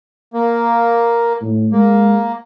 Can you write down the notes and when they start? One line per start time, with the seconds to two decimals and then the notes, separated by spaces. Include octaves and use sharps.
0.34 A#3
1.42 A2
1.72 G#3 A#3